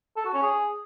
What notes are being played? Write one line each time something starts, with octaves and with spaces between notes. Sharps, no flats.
A4
F#4
C#4
G#4